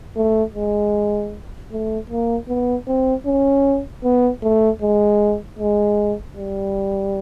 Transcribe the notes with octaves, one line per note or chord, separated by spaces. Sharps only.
A3
G#3
A3
A#3
B3
C4
C#4
B3
A3
G#3
G#3
G3